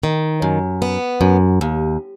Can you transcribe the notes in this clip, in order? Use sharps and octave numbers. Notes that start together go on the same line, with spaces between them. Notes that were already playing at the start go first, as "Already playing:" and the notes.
D#3
F#2
B3
F#2
D#2